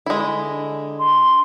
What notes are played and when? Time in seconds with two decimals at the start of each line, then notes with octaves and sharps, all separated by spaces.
0.06 D3 G#3 E4
0.99 C6